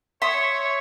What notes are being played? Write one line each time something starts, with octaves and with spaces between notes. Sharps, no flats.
C#5 E5 C6 D#6